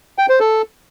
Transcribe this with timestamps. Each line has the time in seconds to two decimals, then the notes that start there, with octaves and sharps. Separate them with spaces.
0.18 G5
0.29 C5
0.40 A4